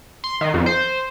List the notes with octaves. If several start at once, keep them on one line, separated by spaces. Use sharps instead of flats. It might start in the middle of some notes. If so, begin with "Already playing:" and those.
C6
D#3
F2
C5